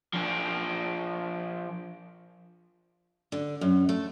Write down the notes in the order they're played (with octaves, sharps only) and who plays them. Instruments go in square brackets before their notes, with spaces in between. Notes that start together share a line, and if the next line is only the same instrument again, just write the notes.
[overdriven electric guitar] F3 D4
[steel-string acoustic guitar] D3
F#2
A3